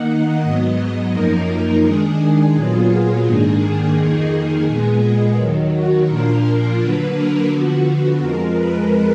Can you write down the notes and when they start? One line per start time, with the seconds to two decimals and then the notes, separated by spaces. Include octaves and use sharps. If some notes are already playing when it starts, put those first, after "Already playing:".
Already playing: D#3 A#3 D#4 F#5
0.43 G#2 F#3 B3 D#5
1.13 F#2 F3 A#3 D#4 A#4
1.84 D#3 G#3 D4 G#4
2.55 A#2 F#3 B3 F4 G#4
3.26 G#2 D#3 A#3 D4
3.61 G#4
3.96 F2 D#3 A#3 D#4 G#4
4.32 G#4
4.67 A#2 G#3 B3
5.37 D#2 D#3 F#3
5.73 F#4
6.08 A#2 F3 A#3 D4 F4 A#4
6.79 D3 F#3 A#3 D4 B4
7.14 A#4
7.50 D3 F3 B3 F#4
8.21 F2 F3 G#3 A#4
8.56 B4